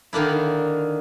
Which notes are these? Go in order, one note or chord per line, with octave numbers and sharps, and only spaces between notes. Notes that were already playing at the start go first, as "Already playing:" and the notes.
D3 D#3 A#3 D4 E4